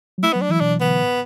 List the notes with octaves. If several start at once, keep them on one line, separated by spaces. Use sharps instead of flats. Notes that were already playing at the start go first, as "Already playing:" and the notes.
F#3
A3 E4
B3
F#3
D4
E3
E4
B2 D4
D3 B3
A2